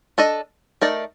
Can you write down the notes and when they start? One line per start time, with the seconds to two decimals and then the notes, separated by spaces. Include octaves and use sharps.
0.18 D4 A4 D#5
0.81 A3 D#4 A#4 D5